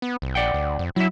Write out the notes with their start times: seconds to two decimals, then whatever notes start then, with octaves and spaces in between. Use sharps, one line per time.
0.02 B3
0.22 C2
0.35 A#1 D5 F#5 G5
0.54 D2
0.79 F2
0.96 F#3 E4 E5